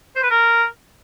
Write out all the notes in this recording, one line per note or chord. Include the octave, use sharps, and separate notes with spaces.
C5
B4
A#4